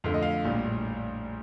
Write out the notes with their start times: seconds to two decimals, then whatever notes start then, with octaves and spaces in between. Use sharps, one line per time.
0.04 F2 D3 A3 F5
0.14 D#5
0.22 F5
0.45 A#1 A2 G3